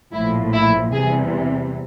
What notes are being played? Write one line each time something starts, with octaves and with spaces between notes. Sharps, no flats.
A#1 A2 F3 E4
E4
E2 C3 E3 G3 G#4